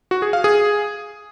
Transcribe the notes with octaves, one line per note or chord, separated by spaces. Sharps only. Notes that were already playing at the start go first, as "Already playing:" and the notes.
F#4
G#4
F5
G#4